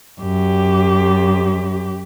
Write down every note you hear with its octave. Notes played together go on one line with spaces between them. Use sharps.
F#2 G4